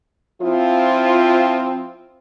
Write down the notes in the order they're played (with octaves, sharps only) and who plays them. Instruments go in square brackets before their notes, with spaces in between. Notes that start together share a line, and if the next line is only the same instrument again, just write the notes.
[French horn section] F3 C4 E4 F4